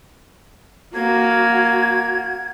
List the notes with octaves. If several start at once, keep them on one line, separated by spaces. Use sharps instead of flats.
A#3 F#4 G#6